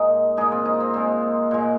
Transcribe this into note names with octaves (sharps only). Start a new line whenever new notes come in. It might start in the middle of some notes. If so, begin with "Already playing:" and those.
Already playing: A#2 G#3 D#4
A#2 G#3 D#4 G#4
C4 F4
D#4
C4
A#2 G#3 C4
A#2 G#3